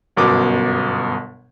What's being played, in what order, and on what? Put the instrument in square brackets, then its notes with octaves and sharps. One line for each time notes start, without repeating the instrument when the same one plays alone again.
[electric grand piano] G1 F#2 B2 D6